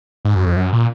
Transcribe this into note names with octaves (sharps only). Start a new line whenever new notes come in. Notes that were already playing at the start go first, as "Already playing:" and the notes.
G#2
F#2
F2
F#2
A#2